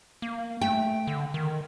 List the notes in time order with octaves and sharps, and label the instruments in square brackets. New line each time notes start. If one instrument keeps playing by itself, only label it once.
[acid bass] A#3
[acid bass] A3 [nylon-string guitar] G5
[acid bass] D3
D#3